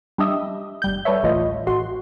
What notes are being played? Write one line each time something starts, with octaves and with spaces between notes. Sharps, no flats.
G3 D4 G4 D#5 E5
G1 G3 G6
G3 A4 B4 C#5 E5
A1 D2 A2 E3 F4 D#5
A1 F#4 C6